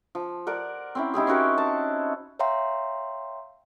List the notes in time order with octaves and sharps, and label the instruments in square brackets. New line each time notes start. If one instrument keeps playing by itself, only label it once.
[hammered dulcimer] F3
A#4 D5 F#5
C4 C#4 E4
D#4 E4 G4 G#4
C4 C#4 F#4 A#4
A5
[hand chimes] C#5 E5 F5 G5 A#5 C6